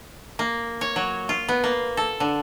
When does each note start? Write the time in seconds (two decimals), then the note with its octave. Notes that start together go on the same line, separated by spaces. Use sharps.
0.39 A#3
0.81 C#5
0.96 F#3
1.29 F4
1.49 B3
1.64 A#3
1.97 A4
2.20 D3